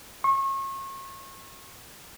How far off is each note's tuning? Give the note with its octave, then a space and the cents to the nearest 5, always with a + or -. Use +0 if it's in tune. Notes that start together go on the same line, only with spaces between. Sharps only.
C#6 -35